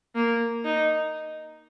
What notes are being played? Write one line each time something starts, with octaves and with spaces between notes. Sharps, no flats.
A#3
D#4